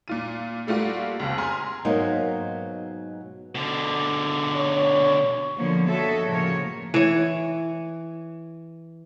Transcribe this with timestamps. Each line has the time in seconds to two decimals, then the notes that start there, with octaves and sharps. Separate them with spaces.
0.08 A#2 F4 D#7
0.67 G3 A3 A#3 F4 F#4
1.19 F1 C#2
1.38 G#5 A#5 C6 F6
1.85 G#2 B2 F#3 A#3 D#4
3.55 B2 D3
4.55 C#5
5.58 D3 F3 F#3 A#3 B3 C#5
5.88 F#4 A4 C#5 D#5 E5
6.27 A2 C#3 F3 A#3 A#4 C#5
6.94 E3 C#5